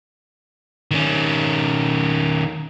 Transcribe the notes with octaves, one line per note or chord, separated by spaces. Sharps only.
D#3 C#4